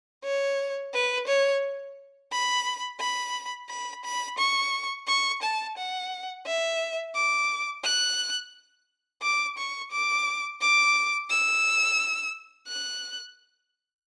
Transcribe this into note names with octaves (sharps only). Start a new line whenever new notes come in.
C#5
B4
C#5
B5
B5
B5
B5
C#6
C#6
A5
F#5
E5
D6
F#6
D6
C#6
D6
D6
E6
F#6